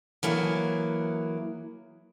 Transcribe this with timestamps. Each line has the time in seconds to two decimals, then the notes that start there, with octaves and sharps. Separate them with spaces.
0.23 E3 F#3 A#3 G#4